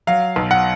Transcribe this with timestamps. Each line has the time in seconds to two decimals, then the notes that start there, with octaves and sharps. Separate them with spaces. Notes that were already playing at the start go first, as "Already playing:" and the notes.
0.07 F#3 F5
0.36 B1
0.51 F#5